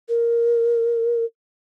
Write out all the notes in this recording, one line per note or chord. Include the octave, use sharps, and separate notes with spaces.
A#4